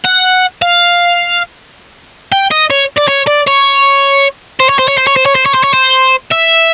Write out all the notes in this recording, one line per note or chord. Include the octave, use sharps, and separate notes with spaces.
F#5
F5
G5
D#5
C#5
D5
C#5
D5
C#5
C5
C#5
C5
C#5
C5
C#5
C5
C#5
C5
C#5
C5
C#5
C5
E5